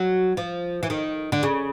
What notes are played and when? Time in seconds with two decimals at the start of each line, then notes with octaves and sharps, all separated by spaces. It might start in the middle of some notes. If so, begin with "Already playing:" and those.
Already playing: F#3
0.37 F3
0.83 E3
0.90 D#3
1.32 D3
1.43 C#3